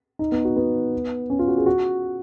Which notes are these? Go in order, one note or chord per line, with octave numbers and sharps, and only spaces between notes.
D#4
B3
F#4
B3
C#4
F4
F#4
G#4
F#4